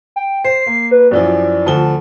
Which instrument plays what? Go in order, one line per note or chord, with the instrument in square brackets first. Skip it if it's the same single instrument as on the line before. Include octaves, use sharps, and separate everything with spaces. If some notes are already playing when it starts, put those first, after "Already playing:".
[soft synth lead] G5
[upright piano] C5 [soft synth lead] C7
[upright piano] A#3
[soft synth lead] B4
[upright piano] F#2 E3 F3 [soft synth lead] D5
[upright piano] D2 F3 G7 [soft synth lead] A5